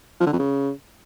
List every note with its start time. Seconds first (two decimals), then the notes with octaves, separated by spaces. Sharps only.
0.20 F3
0.27 D3
0.33 F2
0.39 C#3